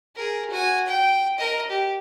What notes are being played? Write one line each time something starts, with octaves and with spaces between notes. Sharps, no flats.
G#4 A#4
F#4 G#5
G5
A#4 D#5
G4